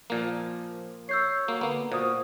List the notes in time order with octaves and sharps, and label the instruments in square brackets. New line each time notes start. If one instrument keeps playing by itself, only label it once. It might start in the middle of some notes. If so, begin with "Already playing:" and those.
[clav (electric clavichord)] A#2 A#3 [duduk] F3
[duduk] C#5 [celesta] E6 G6 C7
[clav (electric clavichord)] A#3 [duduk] F#4
[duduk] D3 [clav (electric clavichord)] A#3 B3
[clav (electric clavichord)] A#2 [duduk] F#4 [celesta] C5 D#6